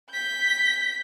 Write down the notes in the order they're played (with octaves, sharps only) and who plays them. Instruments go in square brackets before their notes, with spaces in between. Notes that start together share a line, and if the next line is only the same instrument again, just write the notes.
[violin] G6 B6